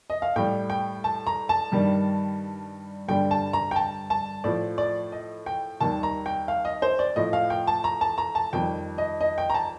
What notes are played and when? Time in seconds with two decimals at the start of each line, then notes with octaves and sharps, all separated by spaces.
0.10 D#5
0.22 F5
0.36 A2 G3 G5
0.70 G5
1.04 A5
1.27 A#5
1.49 A5
1.72 G2 D#3 G3
3.08 G2 D3 G3 G5
3.31 A5
3.53 A#5
3.71 G5
3.76 A5
4.10 A5
4.44 A2 F3 D5
4.78 D5
5.12 D#5
5.46 G5
5.80 D#2 D#3 G3 A5
6.03 A#5
6.26 G5
6.48 F5
6.65 D#5
6.82 C5
6.99 D5
7.16 A2 F3 D#5
7.33 F5
7.50 G5
7.67 A5
7.84 A#5
8.01 A5
8.18 A#5
8.35 A5
8.52 F2 D#3 G3 G5
8.98 D#5
9.21 D#5
9.38 G5
9.50 A#5
9.54 A5